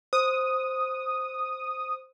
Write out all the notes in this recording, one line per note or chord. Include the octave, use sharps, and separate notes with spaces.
C5 D#6